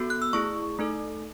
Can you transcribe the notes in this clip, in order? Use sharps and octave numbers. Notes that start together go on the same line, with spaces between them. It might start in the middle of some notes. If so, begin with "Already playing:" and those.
Already playing: B3 F#4 A4
F#6
E6
A3 E4 G#4 C#6
A3 D#4 A4